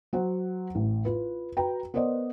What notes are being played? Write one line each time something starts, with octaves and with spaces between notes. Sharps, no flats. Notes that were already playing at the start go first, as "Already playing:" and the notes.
F#3 C5 F#5
A1
F4 B4
F#4 B4 G5 A#5
B3 A#4 C5 D5 D#5